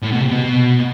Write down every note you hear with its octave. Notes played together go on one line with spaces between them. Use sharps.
A2
B2
C3
B2